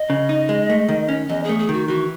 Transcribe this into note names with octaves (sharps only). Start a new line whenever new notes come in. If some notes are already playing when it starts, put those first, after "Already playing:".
Already playing: D#5
C#3
D#4
G#3
A3
D#3
C#4
E2 D#5
G#4
A3
G#4
D#3 F#4
E3 F#4